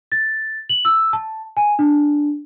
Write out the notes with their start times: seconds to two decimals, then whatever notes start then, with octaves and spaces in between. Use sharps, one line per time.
0.12 A6
0.69 F#7
0.85 E6
1.13 A5
1.57 G#5
1.79 D4